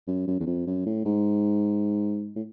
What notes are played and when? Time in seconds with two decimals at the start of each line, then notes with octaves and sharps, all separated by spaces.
0.07 F#2
0.27 F#2
0.40 E2
0.46 F2
0.66 F#2
0.86 A2
1.05 G#2
2.36 A2